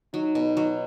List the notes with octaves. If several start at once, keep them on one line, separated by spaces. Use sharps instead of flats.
F#3 D#4
B2
F#3